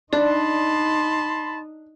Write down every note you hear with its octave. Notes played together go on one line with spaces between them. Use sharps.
D4 D#4 D5 A5 B5 C6